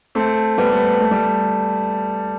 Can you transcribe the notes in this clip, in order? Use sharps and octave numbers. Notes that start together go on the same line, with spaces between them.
A3 C4
G3 B3
A3
A3
G3